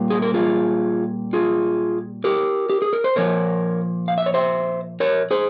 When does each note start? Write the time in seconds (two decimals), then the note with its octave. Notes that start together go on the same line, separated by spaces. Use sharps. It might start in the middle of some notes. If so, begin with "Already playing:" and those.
Already playing: A#2 G3 A#3
0.10 G#4
0.22 A#4
0.34 F4 G#4
1.33 F4 G#4
2.24 G4 A#4
2.70 G4
2.82 G#4
2.93 A#4
3.04 C5
3.16 A#2 F3 A#3 A#4 C#5
4.08 F5
4.18 E5
4.26 C#5
4.34 C5 E5
5.00 A#4 C#5
5.31 G#4 C5